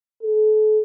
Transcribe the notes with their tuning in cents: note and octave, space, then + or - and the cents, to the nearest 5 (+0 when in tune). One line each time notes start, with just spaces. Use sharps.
A4 -40